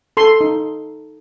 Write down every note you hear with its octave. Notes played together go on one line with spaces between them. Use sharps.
A4 C6
D#4